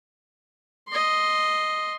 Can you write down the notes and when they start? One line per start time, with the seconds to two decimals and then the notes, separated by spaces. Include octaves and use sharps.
0.88 D#5 C6